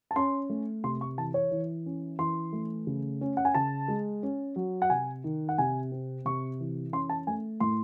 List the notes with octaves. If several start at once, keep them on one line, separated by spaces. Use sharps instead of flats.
A5
C#4 C6
A3
C3 C6
C#6
E3 A5
C#5
E3
C#4
E3 C6
A3
C#3
C#4
F#5
G#5
C#3 A5
G#3
C#4
F#3
F#5
C3 G#5
D#3
F#5
C3 G#5
C4
C3 C#6
E3
C#4 C6
A5
A3 G#5
A2 C6